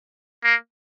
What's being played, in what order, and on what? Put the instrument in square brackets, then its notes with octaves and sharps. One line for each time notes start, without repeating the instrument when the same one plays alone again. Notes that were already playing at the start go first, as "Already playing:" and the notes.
[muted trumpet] A#3